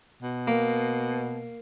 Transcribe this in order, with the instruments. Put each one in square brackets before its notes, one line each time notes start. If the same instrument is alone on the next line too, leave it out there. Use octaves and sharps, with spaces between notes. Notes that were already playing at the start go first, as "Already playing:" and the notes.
[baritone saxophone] B2
[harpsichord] A#3